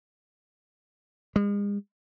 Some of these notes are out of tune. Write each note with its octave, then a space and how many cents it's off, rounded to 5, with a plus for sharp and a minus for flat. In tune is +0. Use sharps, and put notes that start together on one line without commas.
G#3 -40